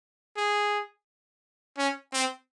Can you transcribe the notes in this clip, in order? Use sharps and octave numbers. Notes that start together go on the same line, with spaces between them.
G#4
C#4
C4